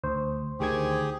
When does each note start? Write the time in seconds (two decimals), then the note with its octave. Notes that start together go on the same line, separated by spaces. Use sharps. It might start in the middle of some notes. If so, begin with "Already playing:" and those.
0.04 D2 C5
0.60 D2 D#3 G4 G#4 G#6